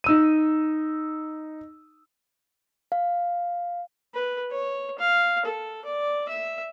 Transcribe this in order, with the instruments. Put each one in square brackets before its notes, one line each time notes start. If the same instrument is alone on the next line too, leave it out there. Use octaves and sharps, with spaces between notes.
[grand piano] D#4 E6 D#7
[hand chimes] F5
[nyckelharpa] B4
C#5
F5
A4
D5
E5